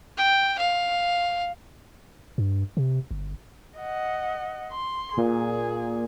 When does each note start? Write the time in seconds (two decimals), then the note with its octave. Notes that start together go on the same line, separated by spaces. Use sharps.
0.17 G5
0.59 F5
2.38 G2
2.77 C3
3.11 G1
3.79 D#5 F#5
4.71 C6
5.17 A#2 G#4